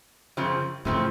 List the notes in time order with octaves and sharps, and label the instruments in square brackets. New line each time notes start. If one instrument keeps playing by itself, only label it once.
[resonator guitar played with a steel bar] F#2 C#3 F3 C4
[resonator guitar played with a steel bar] F#2 C#3 F3 C4 [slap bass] A2